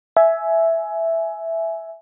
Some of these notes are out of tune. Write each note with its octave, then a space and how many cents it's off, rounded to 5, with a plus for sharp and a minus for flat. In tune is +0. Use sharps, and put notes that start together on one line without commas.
E5 +0 G#5 +15